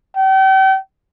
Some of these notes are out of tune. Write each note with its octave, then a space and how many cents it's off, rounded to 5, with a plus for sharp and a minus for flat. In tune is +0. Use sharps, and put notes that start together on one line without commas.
G5 -40